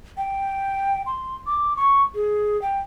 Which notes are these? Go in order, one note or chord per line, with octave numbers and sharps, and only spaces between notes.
G5
C6
D6
C#6
G#4
G5